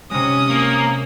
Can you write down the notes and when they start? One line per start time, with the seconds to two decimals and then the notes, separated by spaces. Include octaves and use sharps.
0.11 C3 G#3 C#4 D#6
0.50 A#3